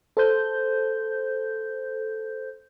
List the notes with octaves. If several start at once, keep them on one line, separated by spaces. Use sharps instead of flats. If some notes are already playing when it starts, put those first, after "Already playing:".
A4 C5 G6